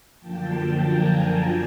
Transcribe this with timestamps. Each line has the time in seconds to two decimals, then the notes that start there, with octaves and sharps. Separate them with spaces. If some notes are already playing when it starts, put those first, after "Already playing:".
0.19 F#2 D3 F3 A#3 G5 A5
0.84 G#5 A#5
1.16 G#5 A#5